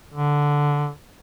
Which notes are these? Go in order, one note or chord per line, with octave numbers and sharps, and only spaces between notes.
D3